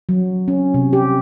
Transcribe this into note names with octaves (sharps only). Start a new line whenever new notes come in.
F#3
C#4
C3
G4